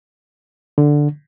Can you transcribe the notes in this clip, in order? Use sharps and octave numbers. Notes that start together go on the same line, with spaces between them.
D3